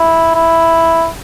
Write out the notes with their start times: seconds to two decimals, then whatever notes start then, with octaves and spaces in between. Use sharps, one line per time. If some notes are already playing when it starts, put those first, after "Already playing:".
Already playing: E4
0.35 E4